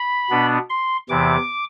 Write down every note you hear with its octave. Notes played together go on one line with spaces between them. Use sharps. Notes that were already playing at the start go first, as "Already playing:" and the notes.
Already playing: B5
B2 B3 D4
C6
E2 C3 E3 D6